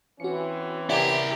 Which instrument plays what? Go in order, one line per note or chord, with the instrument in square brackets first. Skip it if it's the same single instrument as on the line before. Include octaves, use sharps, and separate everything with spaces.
[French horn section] E3 C4 C#4 [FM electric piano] F#4 C#7
[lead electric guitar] E4 A#4 [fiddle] G4 [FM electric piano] D5 F#5 G#5